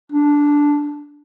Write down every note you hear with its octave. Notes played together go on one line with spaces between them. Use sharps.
D4